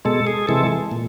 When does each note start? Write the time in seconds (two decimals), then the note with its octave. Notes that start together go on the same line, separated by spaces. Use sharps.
0.05 B2 G#3 A4
0.27 G#4
0.47 C3 E3 G#3 A4
0.92 A#2